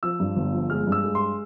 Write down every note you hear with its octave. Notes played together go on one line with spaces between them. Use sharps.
F3 E6
G2
G1
F3
G#3 F6
G2
E6
G#3
C6